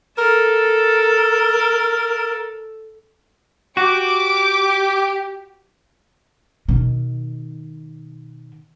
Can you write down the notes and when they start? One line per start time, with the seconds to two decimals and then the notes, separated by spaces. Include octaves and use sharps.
0.18 A4 A#4
3.77 F#4 G4 D6 D7
6.68 B2 D#3